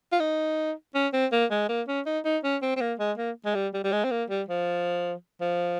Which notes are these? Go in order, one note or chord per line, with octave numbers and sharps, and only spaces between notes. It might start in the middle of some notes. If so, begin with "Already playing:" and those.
F4
D#4
C#4
C4
A#3
G#3
A#3
C#4
D#4
D#4
C#4
C4
C4
A#3
G#3
A#3
G#3
G3
G3
G3
G#3
C4
A#3
G3
F3
F3